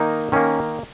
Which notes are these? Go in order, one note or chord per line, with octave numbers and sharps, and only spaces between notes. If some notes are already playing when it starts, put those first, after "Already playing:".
Already playing: D#3 A#3 D#4
D#3 A#3 C#4